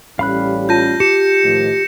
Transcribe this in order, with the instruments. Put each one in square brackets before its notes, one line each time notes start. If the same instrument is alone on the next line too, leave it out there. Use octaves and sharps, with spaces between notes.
[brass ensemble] A1 G3 C#4 [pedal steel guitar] F5 B5 F#6
[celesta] F4 A5 D#7 [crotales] G6 A#6
[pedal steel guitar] G4 [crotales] C#7 E7
[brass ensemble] A2 D#3 F3